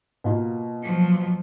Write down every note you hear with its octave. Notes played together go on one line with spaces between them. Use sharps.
B2 A#3 F4
F3 F#3